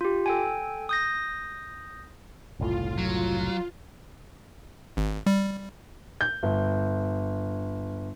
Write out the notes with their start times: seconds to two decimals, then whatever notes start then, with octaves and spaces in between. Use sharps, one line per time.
0.01 F4 G4
0.26 A4 G5 G#5
0.89 D#6 G6 A#6
2.60 F#1 C2 A2 F4
2.98 F#3
4.97 G#1
5.26 G3
6.21 G6
6.43 G1